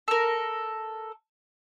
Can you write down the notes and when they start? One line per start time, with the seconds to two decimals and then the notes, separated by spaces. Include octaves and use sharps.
0.08 A4 A#4